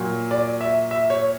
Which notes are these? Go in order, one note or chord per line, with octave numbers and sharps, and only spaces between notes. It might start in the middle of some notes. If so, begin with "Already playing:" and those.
Already playing: A#2 F#3
D5
E5
E5
C#5